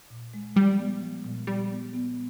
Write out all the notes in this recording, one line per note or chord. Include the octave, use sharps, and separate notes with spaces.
A#2
G#3
F3 G3
B3
F3
A#2
A#2 G3
B3
B3